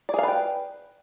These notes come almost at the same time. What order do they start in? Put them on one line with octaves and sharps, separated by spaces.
D5 G#4 F5 B4 G5